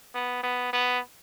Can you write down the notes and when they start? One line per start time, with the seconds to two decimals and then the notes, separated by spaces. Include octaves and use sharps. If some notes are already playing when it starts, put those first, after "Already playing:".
0.15 B3
0.43 B3
0.73 B3